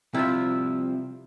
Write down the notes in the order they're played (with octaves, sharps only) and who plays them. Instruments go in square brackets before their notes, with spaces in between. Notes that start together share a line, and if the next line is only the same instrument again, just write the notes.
[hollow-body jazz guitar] C3 [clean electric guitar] F3 G3 C4 [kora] E4 F4 E5